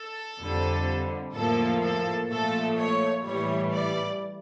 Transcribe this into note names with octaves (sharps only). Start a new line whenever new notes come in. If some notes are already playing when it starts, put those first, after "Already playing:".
Already playing: A4
F2 D3 G3
A2 F3 A#3 A4
A4
A#2 F3 A3 A4
C#5
A2 E3 G3 C#5
D5